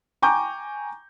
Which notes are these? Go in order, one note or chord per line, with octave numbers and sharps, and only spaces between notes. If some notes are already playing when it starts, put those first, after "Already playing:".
G5 G#5 A#5 C#6 D6 G6